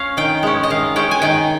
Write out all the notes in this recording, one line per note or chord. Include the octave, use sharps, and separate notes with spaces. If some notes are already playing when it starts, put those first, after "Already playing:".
Already playing: C#4 F5
D#3 G5
G#3 C#4
D#5
D#3 F5
G#3 C#4 G5
G#5
D#3 G5